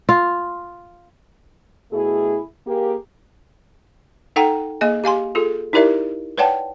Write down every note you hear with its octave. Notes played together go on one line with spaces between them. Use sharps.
F4
B2 A3 E4 G#4
A#3 G4 G#4
D#4 A4 F#5 G5 A#5
A#3 G#4 D#5 G#5
G4 F5 G#5 C6
F4 G#4 A4
D#4 E4 G4 A#4 D5 E5
B4 C#5 D5 F#5 G5 A5